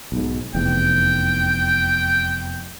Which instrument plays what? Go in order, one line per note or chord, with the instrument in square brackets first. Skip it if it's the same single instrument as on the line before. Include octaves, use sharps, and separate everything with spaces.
[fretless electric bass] B1 G#2
[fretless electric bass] F1 E2 [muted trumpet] G5